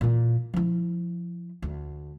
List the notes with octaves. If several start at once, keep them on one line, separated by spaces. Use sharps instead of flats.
A#2 E3
F3 E4
D2